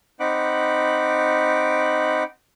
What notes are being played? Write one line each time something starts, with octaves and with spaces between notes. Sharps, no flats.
C4 D#4 F#5 B5 D6